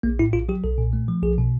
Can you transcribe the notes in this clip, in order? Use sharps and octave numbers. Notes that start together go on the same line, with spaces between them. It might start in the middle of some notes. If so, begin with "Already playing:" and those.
A#1 A#3
A2 E4
A#1 F4
F#3 G4
B1 A4
A#2
A3
F3
B1 G#4
B2